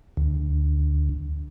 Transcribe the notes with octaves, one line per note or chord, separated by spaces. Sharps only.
D2